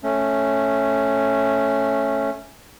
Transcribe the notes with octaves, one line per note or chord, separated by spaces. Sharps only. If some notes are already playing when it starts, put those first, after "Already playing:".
A3 C#4